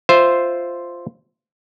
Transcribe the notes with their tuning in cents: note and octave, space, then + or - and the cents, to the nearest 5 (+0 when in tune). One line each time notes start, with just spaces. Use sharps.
F4 +0 C5 +0 E5 +5